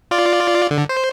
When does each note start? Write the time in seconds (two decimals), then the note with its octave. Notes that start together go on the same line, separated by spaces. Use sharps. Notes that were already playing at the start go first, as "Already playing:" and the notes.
0.11 F4 D5
0.71 D3
0.89 C5